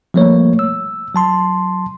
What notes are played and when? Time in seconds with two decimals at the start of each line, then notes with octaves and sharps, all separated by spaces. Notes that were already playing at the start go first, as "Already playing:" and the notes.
0.14 F3 G3 A3 A#3 C#5
0.59 E6
1.15 F#3 A5 C6